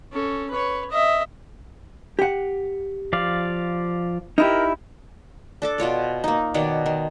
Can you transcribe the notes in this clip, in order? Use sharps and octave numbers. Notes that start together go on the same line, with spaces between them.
C#4 A4
B4 C#5
D#5 E5
G4 F#5
F3 D5 F5
D#4 E4 G4 A#4
D4 A4 D6
B2 F4 C#5 D5
A#3 D#4
B2 D#3 C#5 D5
D#3